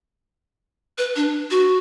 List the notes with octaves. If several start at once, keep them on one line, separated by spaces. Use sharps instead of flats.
B4
D4
F#4